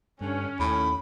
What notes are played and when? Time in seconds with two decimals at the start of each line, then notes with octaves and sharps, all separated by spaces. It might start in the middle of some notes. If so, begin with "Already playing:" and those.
0.21 G2 D3 C#4
0.59 D#2 A2 B5